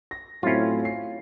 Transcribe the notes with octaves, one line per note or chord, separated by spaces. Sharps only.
A#6
A2 F#3 C4 C#4 E4 F4
C7